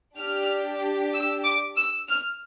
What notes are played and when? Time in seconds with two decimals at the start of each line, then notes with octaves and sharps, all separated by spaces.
0.18 D4 G4 F6
1.14 E6
1.44 D6
1.76 E6
2.09 F6